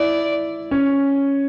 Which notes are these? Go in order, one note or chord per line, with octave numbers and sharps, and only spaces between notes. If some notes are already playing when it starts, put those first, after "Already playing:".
Already playing: E4 D5
C#4